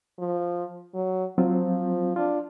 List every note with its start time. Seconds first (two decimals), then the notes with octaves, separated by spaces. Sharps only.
0.19 F3
0.94 F#3
1.38 F3 F#3 C4 F4
2.16 D4 F4